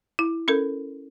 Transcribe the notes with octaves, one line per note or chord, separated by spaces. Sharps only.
E4
C#4 A4 A#4